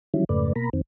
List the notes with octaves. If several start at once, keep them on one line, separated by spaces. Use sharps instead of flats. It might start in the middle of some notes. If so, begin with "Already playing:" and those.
D#3 E3 F#3 G3 C#4 E4
F2 G#2 C#3 A3 B4 D5
B2 A#3 A#5 B5
F2 D#3 C4